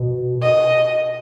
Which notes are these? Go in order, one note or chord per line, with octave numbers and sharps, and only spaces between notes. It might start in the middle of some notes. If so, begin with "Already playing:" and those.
Already playing: B2
D#5